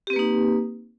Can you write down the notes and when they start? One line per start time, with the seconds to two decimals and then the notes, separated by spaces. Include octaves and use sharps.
0.07 G4
0.10 C4
0.13 B4
0.16 A#3
0.19 D#4